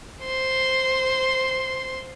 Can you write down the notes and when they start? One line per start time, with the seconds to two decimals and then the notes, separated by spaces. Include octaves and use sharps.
0.24 C5 C6